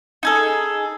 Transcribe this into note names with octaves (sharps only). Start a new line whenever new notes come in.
D#4 G#4 A4